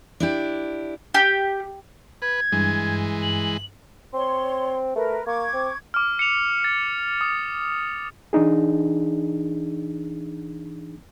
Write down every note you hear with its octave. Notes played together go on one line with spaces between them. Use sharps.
D4 E4 G4
G4
B4 G#6
G2 E3 G#3
F#7
C4 C#5 C6
A3 A#4 B4
A#3 C#6 D6 G#6
C4
D6 F6
C#7 F7
A6
D#6
E3 D4 D#4 G#4